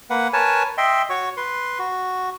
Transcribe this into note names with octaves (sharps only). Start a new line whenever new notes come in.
A#3 B4 F#5
A#4 B4 C#5 G#5 A5
D#5 E5 G5 C6
F#4 C#5 C#6
B4 C6
F#4